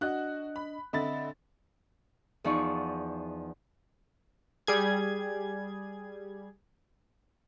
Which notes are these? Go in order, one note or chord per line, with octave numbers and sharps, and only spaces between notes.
D4 F#4 D#5 F#6
B5
D3 C4 D#5 E5 B5 A6
E2 F3 D#4 D5 C#6
G3 G#4 G#6